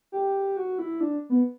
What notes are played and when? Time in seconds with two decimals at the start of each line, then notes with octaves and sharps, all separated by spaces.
0.12 G4
0.57 F#4
0.78 E4
1.00 D4
1.30 B3